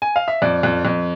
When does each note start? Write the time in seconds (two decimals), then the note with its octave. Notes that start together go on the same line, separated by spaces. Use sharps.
0.02 G#5
0.16 F5
0.28 E5
0.42 F2 D5
0.63 F2
0.85 F2